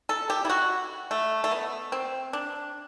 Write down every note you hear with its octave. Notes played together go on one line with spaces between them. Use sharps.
A4
G4
E4
F#4
A3
A3
B3
C4
D4